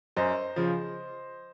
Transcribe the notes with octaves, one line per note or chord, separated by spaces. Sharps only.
F#2 C5 D#5
C#3 F3